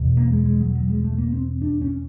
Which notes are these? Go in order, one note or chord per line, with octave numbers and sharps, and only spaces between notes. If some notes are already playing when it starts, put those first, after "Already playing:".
Already playing: E2 B2
A#3
G#3
G#3
F#3
F#3
G#3
A3
A#3
C4
D4
C#4